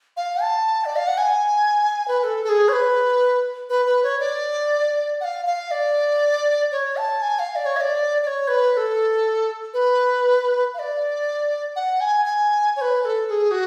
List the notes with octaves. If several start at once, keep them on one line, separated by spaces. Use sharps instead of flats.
F5
A5
D5
F5
F#5
G#5
B4
B4
A4
A4
G#4
C#5
B4
B4
B4
C#5
D5
F#5
F5
F5
D5
C#5
A5
G#5
F5
D5
C#5
F5
D5
D5
C#5
B4
B4
A4
B4
F5
D5
F#5
G#5
G#5
C#5
B4
B4
A4
A4
G#4
F#4